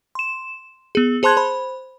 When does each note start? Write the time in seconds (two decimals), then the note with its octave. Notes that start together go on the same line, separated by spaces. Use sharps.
0.15 C6 E7
0.95 B3 G#4
1.23 G#4 C5 A5 C6 F#6 G#6
1.37 C5 B5